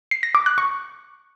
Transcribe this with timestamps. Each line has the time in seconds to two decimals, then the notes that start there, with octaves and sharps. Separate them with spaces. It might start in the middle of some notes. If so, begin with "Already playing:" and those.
0.11 C7
0.23 A#6
0.35 D6
0.46 F#6
0.58 C#6